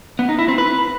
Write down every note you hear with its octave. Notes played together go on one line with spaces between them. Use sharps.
B3
D#4
E4
C4
B4